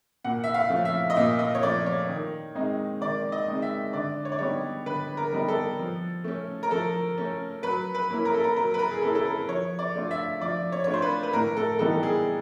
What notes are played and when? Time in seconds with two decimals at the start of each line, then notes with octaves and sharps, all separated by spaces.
0.24 A#2 F#5
0.44 E5
0.54 F5
0.70 F3 A3 C#4
0.85 E5
1.10 D#5
1.17 A#2 E5
1.39 D#5
1.55 C#5
1.63 F3 A3 C#4 D5
1.86 C#5
2.09 D#3
2.55 G#3 C4 D#4
3.01 D#3 D5
3.32 D#5
3.48 G#3 C4 D#4
3.62 E5
3.93 D3 D5
4.25 C#5
4.32 D5
4.39 G3 B3 D#4 C#5
4.86 D3 B4
5.17 A#4
5.33 G3 B3 D#4
5.48 A4
5.79 F3
6.24 A3 C#4
6.63 A#4
6.71 F3 A4
7.18 A3 C#4
7.63 F#3 B4
7.95 B4
8.10 A#3 C#4 E4
8.25 A#4
8.34 A4
8.44 A#4
8.56 F#3 A#4
8.74 B4
8.79 A#4
8.91 G#4
9.02 A#3 C#4 E4 A4
9.15 A4
9.26 A#4
9.49 F3 C#5
9.79 D5
9.95 A3 D4 F4
10.11 E5
10.41 F3 D5
10.72 C#5
10.84 A3 D4 F4 C#5
10.94 C5
11.02 B4
11.23 B4
11.33 A2 A#4
11.57 A4
11.79 E3 G3 B3 D#4 A4
12.03 G#4